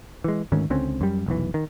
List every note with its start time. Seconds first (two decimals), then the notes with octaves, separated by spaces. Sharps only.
0.24 E3 G#3
0.52 D2 G#2 D#3 C#4
0.70 C#2 D3 C4 C#4
1.01 F#2 G3
1.26 F1 B1 E3
1.54 D#3